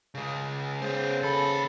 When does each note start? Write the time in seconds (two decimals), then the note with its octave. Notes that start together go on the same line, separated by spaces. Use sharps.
0.15 C#3 G#3
0.82 C#3 B3 C5
1.22 D#2 A4 B5